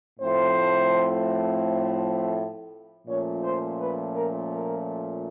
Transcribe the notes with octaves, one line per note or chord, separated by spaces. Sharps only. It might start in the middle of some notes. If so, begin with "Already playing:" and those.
A2 F3 A3 C4 C5
A#2 F3 A3 C#4 C#5
C5
B4
A#4
A#4